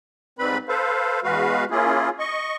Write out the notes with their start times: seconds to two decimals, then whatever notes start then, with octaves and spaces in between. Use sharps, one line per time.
0.39 G#2 G3 C4 B4 B5
0.69 A4 B4 C5 F5
1.23 E2 G#3 F#4 B4 F5
1.71 A#3 C#4 E4 F4 G#4
2.19 D#5 C#6